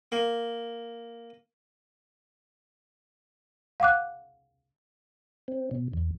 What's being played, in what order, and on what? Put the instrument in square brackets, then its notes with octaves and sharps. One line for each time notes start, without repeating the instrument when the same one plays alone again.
[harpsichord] A#3
[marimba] F5 F#5 D6 F#6
[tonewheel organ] C4
B2
E2